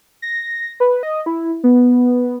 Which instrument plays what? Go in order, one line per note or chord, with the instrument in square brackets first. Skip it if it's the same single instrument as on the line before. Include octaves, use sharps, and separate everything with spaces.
[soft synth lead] A#6
B4
D#5
E4
B3